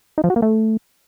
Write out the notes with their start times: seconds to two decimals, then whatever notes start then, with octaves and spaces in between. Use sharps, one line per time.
0.18 D#4
0.24 F3
0.30 F#4
0.36 A#3
0.42 A3